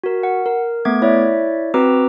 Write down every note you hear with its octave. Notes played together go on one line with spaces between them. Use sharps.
F#4 A#4
F#5
A#4
A3 B3 D6 G#6
E4 C#5 D5 E5
C4 F#4 B4 A#5 D6 E6